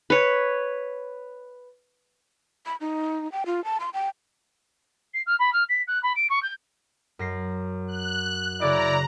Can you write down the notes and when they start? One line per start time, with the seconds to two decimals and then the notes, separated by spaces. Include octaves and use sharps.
0.10 B4 C#5
2.66 B5
2.81 D#4
3.32 G5
3.46 F4
3.65 A5
3.80 C6
3.94 G5
5.13 C7
5.26 F6
5.39 B5
5.52 F6
5.69 B6
5.87 F#6
6.02 B5
6.15 D7
6.29 C#6
6.42 G6
7.19 F#2 A#6 C7
7.87 F#6
8.61 C#3 C#4 E4 D5 A#5 D7